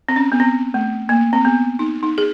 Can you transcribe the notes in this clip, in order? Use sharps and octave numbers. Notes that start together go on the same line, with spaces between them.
C4
C#4
B3
C4
A3
A#3
C4
B3
D#4
D#4
G#4